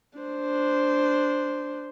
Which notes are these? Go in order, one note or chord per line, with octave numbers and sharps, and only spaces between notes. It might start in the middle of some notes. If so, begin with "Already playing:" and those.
D4 C5